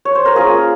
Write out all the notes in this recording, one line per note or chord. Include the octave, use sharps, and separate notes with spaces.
C#5
C5
A#4
A#3 C#4 F4 G#4